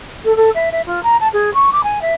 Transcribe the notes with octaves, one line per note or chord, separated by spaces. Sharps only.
A4
A4
E5
E5
F4
A#5
A5
G#4
C#6
D6
G#5
E5